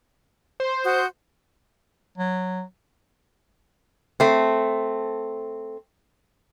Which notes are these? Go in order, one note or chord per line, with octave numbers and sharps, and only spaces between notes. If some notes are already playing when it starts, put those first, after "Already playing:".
C5
F#4 D#6 G6
F#3
A3 C4